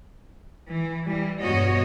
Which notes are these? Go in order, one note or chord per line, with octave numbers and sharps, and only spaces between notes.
E3
E3 G3
E2 G2 B2 F#4 C#5 D#5